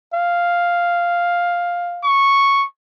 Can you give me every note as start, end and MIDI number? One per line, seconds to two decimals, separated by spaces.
0.14 2.09 77
2.04 2.65 85